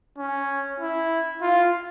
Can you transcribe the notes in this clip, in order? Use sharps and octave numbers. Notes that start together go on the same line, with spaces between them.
C#4
E4
F4